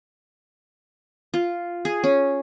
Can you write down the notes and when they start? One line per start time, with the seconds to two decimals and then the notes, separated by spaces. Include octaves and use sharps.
1.34 F4
1.85 G#4
2.04 C#4